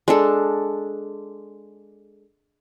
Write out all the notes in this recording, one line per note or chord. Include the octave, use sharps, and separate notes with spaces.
G#3 D4 A4